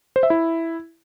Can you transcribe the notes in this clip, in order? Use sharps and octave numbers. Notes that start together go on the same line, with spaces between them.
C5
E5
E4